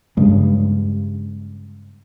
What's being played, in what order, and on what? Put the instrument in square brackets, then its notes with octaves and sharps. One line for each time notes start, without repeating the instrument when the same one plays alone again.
[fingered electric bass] G2 C#3 G#3